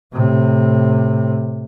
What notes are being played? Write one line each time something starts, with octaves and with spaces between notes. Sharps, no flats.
A2 C3